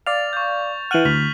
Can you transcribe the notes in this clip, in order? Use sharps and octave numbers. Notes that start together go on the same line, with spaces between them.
D5 F5 A6 F7
C#6 G6
E3 F#5 F6 D#7 F#7
D2 F6 B6 F7